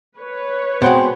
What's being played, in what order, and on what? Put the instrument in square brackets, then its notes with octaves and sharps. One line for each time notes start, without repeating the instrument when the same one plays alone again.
[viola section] B4 C#5
[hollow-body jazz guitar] B2 G#3 [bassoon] C4 [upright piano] C5 F#5 G5